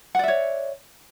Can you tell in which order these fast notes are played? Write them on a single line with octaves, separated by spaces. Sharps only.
F#5 D5 E5 C#5